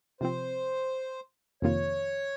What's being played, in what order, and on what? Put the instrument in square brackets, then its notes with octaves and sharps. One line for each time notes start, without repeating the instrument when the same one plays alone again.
[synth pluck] C3 F3 C4 [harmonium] C5
[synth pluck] F2 C3 D#3 A#3 F4 [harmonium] C#5